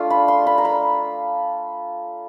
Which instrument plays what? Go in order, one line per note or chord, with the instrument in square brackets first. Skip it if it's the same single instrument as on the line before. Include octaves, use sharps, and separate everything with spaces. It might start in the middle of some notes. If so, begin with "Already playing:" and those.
Already playing: [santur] A3 D4 F4
B5
C6
B5
A#5
B5